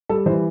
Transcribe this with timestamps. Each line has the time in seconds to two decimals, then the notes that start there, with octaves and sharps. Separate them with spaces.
0.09 G3 A4
0.26 E3 C5